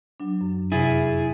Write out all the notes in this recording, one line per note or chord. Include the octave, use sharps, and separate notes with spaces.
F#3 D4
F#2
F2 C3 E4 G#4 A6